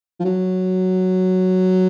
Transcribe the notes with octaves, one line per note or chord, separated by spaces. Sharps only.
F3
F#3